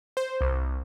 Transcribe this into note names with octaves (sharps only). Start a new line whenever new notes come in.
C5
C2